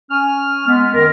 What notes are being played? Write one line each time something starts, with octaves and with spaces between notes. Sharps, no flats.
C#4 G#5 F6
G#3 B3
F#2 D#3 A#4